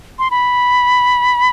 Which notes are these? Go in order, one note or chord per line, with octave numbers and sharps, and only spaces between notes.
C6
B5